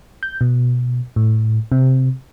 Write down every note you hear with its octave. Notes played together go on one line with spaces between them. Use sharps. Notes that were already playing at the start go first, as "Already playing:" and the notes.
G6
B2
A2
C3